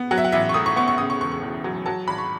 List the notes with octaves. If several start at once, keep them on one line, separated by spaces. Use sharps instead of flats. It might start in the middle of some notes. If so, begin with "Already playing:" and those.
Already playing: B3
F#3 F#5
E5
F#5
A1 E5
C#6
A2 D#6
C#6
B3 C#6
C#6
C#3 D#6
C#6
E1 C#6
C#6
E2
F#3
F#3 A5
G#1 B5
C#6